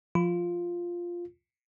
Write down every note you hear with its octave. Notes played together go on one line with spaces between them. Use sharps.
F3 F4